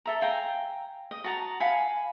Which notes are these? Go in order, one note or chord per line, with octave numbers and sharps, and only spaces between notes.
A4 E5 A#5
F5 G5 G#5 A#5
D#5
F#4 A5 A#5
F5 F#5 G#5 B5